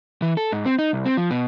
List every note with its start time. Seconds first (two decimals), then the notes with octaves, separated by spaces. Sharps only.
0.22 E3
0.37 A4
0.52 G#2
0.66 C4
0.79 D#4
0.93 C2
1.05 C4
1.17 F3
1.31 B2